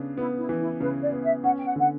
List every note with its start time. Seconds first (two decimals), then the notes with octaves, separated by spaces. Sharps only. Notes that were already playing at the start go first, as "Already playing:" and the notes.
Already playing: C#3 B3 D4
0.17 B3 E4
0.38 E4
0.49 E3
0.60 E4
0.80 C#3 B4
1.02 D5
1.12 B3
1.22 E5
1.44 C#4 F#5
1.58 G5
1.65 F#5
1.76 D3 F#5